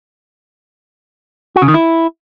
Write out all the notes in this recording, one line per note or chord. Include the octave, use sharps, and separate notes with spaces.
F#4
C#3
D#3
E4